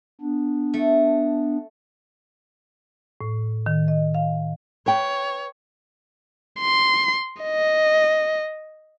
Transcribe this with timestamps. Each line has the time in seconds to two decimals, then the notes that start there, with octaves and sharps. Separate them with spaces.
0.21 B3 D4
0.74 A3
3.21 A2
3.66 D#3
3.88 D#5
4.15 F5
4.86 B4 C#5 G5
6.60 C6
7.42 D#5